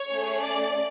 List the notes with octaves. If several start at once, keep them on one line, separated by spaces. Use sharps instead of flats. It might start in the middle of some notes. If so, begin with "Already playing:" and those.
Already playing: C#5
A3 C#4 G#4
D5